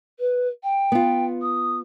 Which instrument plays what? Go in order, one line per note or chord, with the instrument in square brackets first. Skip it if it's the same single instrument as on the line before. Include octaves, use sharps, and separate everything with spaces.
[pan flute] B4
G5
[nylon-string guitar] B3 F4
[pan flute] D#6